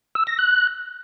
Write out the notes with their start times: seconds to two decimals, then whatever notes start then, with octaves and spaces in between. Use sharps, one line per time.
0.15 E6
0.27 A#6
0.39 F#6